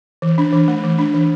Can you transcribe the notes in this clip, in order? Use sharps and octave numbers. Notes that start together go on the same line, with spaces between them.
E3
D4
E3
A3
E3
D4
E3